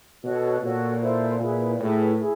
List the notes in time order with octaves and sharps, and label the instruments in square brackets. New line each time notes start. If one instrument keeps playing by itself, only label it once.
[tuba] B2 [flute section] F#4 A4 C#5
[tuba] A#2 [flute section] F#4 A4 C#5
[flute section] E4 A4 C5
[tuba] A#2 [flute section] E4 G#4 B4
[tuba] A2 [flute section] E4 G#4 B4
[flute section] E4 G#4